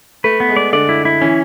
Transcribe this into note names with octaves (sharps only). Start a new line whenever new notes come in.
A3 B4
B3
G#3
D5
D3 D5
E4
E4
E3 C#4